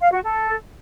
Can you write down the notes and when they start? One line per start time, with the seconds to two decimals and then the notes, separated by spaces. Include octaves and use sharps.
0.01 F5
0.12 F#4
0.24 A4